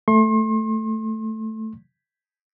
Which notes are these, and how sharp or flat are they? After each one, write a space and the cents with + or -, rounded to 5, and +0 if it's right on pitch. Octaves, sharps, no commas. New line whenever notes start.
A3 +0 C6 +40